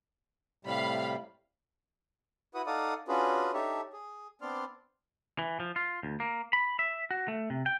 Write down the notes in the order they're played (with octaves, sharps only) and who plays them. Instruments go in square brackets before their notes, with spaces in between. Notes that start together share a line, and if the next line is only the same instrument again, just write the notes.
[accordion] A2 C3 G3 [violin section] F5 B5
[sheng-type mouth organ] E4 F#4 B4 F#5 D#6
D#4 A4 D5 F5 F#5 D#6
C#4 D4 F4 F#4 G#4 B4
D4 D#4 G4 A4 C#5 E5
G#4
B3 C4 D4 D5 C6 F6
[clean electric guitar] E3
F3
F4
D2
A#3
B5
E5
F#4
A3
C3
G5